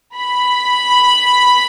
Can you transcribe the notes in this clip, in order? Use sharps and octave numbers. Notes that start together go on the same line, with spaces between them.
B5